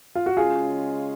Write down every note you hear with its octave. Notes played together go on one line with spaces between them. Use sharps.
F4
F#4
C#3 G#3 C#4 F4 G#4